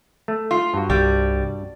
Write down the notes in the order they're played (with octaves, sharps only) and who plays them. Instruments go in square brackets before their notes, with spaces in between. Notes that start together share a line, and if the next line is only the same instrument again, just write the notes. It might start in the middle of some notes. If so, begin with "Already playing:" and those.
[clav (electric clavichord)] A3
[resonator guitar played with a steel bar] F4
[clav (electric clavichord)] G2 F#4
[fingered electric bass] C2 [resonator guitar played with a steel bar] G3